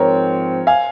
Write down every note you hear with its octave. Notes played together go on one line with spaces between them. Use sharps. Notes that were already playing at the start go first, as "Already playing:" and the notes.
Already playing: G#2 F3 C4 A#4 C#5
F5 G#5